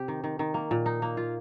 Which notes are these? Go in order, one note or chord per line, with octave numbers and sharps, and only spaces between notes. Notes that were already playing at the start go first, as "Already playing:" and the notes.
Already playing: C3 G4
D#3
D#3
D#3
A#3
A#2
D#4
A#3
F4